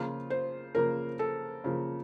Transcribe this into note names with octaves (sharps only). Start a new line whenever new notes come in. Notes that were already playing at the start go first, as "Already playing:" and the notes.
Already playing: C#3 F3 A#3 F4
C5
C#3 F3 A#3 A#4
A4
C#3 F3 A#3